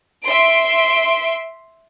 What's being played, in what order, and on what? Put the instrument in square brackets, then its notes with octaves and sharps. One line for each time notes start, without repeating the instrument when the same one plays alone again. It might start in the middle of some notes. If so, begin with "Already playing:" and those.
[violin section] E5 C6 D7